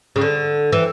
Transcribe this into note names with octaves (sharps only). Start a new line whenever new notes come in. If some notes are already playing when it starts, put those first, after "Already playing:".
C#3
D3
E3